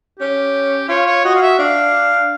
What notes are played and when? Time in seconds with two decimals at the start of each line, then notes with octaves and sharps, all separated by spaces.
0.20 C#4 G4
0.89 F4 C#5
1.06 C#5
1.24 F#4 D#5
1.35 F5
1.42 E5
1.58 D4 F5